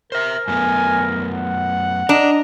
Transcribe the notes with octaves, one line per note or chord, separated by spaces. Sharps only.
A#4 C5 E5
F#2 A3 B3 G#5
F#5
D4 D#5 A#5